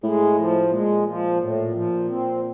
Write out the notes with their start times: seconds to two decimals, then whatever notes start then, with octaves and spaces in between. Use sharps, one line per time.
0.04 A2 G#3
0.38 F3
0.71 A#2 G#3
1.06 F3
1.39 A2
1.74 F3
2.08 C4